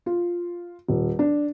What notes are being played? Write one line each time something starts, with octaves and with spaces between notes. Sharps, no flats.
F4
D#1
D4